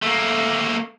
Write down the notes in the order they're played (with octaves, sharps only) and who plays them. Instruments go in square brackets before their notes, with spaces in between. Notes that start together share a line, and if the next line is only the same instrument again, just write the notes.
[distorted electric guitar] A3 A#3